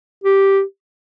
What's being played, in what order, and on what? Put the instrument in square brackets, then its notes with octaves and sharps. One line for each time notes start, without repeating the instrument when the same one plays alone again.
[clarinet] G4